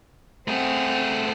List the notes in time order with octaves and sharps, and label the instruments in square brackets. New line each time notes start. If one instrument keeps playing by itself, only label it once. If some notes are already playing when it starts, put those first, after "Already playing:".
[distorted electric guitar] A3 G#4 [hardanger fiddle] C4 F#5